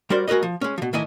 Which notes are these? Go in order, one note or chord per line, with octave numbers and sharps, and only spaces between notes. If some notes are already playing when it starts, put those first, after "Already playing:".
G3 F#4 A#4 C5 D5 C6
G#3 F#4 A#4 B4 D#5
F3
G#3 C#4
B2 F3
A2 D#3 E3 E4 D#5 G#5